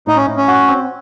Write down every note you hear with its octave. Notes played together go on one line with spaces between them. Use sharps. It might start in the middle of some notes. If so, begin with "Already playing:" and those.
A2 D#4
C#4
A2
C#4
F#4
C4